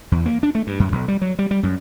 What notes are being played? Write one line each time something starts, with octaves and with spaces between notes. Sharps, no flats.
E2
A#3
D4
A3
G2
F#2
B1
G3
F#3
G3
G3
F#2